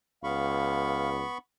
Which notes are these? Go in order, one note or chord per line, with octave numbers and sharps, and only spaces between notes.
C#2 B3 F5 B5 C#6